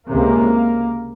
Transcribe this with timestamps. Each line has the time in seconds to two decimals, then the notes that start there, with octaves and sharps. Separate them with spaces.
0.09 C#2 C3 A#3